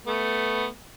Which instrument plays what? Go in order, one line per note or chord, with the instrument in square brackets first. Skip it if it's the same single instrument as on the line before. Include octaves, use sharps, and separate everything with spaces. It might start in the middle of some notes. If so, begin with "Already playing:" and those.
[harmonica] A3 B3